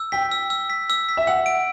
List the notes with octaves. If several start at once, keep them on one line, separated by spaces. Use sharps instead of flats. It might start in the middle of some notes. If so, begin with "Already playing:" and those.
Already playing: E6
G5 B6
E6
E6
B6
E6
B6
E5
F#5 E6
D7